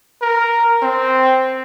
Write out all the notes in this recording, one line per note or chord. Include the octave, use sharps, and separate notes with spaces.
A#4
C4